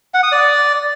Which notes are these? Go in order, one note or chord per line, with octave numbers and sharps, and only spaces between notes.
F#5
D#6
D5